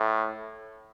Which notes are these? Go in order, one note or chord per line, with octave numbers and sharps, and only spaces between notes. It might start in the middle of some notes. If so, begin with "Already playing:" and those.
Already playing: A2